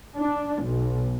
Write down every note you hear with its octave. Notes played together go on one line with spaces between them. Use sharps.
D4
B1